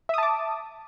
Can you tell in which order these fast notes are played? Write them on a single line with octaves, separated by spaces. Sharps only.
E5 D#6 A5 D6